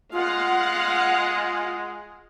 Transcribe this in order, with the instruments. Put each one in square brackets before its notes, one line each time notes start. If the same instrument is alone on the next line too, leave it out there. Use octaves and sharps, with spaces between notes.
[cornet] G#3 [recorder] F4 [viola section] F5 F#5